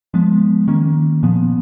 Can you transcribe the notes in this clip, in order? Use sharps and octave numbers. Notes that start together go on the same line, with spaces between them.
F3 G#3 B3
D#3 A#3 C#4
A#2 F3 B3